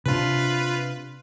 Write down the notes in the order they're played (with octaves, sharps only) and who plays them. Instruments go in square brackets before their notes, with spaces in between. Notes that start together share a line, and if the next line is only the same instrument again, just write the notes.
[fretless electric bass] C3 C#4 D4 [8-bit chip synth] F4 B4